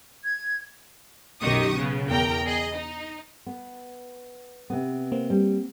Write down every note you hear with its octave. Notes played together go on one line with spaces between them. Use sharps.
G#6
B1 F#2 D#3 G4 C#6 D#6
C#3 B3 C#4
E2 A#4 G5 A#5
G#4 D#5
D#4
B3
C3 B3
A#3 C4
G3